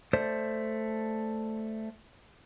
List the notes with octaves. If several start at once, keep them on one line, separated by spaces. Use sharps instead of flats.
A3 C5 D5